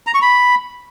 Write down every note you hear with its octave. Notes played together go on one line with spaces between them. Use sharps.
A#5
C#6
B5